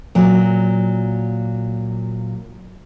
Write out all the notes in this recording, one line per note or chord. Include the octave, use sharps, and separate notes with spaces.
A#2 F#3